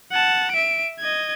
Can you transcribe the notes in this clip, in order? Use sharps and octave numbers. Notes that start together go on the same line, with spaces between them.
F#5 A5
E5 D7
D#5 G#6